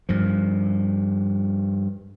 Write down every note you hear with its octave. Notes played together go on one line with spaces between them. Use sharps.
G2 F3